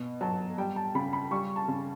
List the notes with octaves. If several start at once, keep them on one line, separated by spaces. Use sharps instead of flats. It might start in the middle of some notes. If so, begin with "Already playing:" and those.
Already playing: B2
F#3 A5
G3 G5
A5
C#3 B5
B5
G3 C#6
A5
C#3